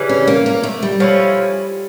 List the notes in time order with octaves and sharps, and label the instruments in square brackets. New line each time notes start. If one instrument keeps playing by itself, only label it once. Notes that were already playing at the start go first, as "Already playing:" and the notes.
Already playing: [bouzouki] C#3 E3 G3
[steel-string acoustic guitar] C#4
A#3
A#3
A3
G3
[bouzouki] F3 C#4 E4